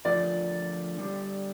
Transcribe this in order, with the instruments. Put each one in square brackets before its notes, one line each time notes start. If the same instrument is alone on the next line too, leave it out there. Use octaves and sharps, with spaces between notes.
[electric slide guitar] D3 F3 A3 D4 F4 [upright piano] D5
[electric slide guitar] D3 G3 D4 G4